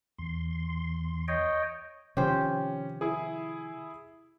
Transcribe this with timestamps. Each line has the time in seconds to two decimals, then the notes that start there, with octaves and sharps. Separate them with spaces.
0.18 E2 C6
1.28 C#5 D#5 G5
2.17 C3 D#3 F3 C#4 G4 C5
3.01 E4 G#4